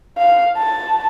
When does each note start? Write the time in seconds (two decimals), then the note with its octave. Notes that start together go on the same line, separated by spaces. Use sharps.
0.18 F5
0.58 A5